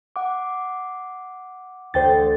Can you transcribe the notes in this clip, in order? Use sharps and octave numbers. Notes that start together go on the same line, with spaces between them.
F#5 D6
D2 C5 G5 A6